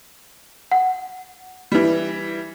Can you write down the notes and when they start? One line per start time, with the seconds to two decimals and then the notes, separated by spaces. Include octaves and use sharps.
0.72 F#5
1.72 E3 G3